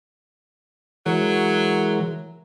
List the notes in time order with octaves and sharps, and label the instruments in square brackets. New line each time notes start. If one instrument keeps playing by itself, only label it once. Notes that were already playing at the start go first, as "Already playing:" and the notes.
[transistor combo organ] E3 G#3 A#4 [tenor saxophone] F#3